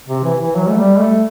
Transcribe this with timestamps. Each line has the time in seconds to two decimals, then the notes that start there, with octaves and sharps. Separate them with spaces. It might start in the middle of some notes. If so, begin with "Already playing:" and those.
0.08 C3
0.24 E3
0.41 E3
0.56 F#3
0.69 A3
0.77 G3
0.99 A3